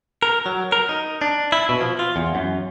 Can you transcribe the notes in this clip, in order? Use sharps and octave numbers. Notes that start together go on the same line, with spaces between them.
A#4
F#3
A#4
D#4
D4
E4
B2
F3
F4
E2
F#2